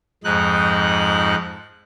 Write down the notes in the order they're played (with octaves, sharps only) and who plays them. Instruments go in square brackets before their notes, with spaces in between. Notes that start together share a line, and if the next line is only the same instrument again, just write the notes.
[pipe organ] F2 G#2 D#4 F#6